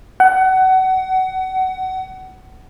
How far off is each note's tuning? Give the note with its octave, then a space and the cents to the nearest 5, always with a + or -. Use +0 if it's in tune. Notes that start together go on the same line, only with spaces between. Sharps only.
F#5 +25